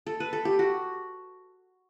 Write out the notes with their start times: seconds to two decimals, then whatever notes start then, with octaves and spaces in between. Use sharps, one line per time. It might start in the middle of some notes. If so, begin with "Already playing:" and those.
0.07 A4
0.20 B4
0.33 A4
0.45 G4
0.59 F#4